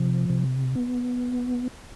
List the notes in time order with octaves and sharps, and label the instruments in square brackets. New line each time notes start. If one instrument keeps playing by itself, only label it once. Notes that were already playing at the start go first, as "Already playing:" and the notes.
Already playing: [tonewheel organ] C3 F3
C3
B3